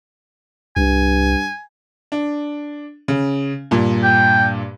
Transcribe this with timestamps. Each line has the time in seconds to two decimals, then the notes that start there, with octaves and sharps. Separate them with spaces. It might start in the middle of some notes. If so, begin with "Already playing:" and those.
0.77 C2 G2 G#5
2.12 D4
3.08 C#3
3.71 G2 A#2
4.04 G5